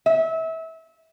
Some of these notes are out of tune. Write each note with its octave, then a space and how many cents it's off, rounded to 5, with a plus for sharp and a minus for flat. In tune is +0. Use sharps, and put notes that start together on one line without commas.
E5 -25